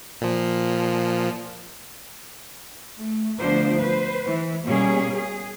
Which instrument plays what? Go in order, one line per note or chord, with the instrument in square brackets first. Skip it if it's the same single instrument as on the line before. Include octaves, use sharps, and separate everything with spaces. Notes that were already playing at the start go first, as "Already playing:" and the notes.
[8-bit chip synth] A#2 F3
[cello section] A3
D2 F3 B3 D4 C5
B4 C5
E3
B2 G3 A#3 C#4 G#4
G#4